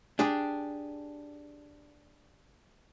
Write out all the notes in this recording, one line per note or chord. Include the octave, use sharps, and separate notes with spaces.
D4 G4 G#4